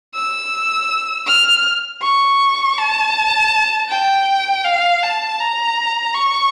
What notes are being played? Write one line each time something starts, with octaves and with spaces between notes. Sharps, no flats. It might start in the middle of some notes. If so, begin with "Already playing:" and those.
E6
F6
C#6
A5
G5
F5
A5
A#5
C#6